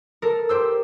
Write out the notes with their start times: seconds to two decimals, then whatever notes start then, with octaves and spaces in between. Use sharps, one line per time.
0.22 A4 A#4
0.49 G4 C5 E6